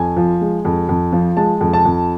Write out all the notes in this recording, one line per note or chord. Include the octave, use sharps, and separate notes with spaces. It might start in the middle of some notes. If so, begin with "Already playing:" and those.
Already playing: F2 G#5
F3
G#3
F2
F2
F3
G#3 A5
F2
A5
F2